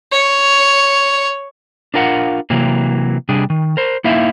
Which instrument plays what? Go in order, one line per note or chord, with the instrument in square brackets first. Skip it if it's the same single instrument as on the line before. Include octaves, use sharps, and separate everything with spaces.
[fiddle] C#5
[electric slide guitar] D4 F4 A#4 F5 F#5
C3 E3 F#3 A#3
C3 G3 D4 G#4
D#3
A#4 C5
A#3 D#4 E4 E5 F5